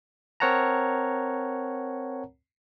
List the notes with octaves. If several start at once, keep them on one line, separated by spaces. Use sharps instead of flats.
C4 A#4 C#5 F#5 A5 A#5